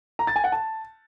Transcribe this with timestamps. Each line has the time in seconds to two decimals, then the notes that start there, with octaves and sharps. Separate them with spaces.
0.19 A#5
0.27 A6
0.36 G#5
0.44 F#5
0.52 A5